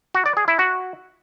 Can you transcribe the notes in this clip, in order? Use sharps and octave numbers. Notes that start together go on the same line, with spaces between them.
F#4
D5
G#4
E4
F#4